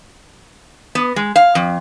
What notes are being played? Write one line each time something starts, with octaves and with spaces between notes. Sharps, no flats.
B3
G#3
F5
F2